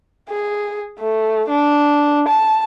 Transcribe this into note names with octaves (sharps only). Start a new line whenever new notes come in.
G#4
A3
D4
A5